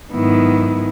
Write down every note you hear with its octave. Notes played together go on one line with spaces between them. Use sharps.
G#2 D#3 F#3 B3 E4